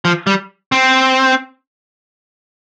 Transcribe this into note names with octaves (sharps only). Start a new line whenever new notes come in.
F3
G3
C4